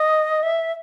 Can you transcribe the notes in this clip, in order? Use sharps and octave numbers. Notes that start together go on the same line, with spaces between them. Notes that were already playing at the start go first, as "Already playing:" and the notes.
Already playing: D#5
E5